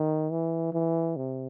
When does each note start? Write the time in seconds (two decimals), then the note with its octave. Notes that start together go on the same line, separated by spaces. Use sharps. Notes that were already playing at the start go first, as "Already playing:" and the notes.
Already playing: D#3
0.30 E3
0.73 E3
1.16 C3